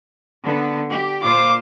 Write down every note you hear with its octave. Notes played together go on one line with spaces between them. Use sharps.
D3 B3
G4
A#2 F4 C5 D6